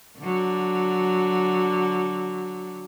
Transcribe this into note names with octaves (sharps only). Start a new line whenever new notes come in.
D3 F#3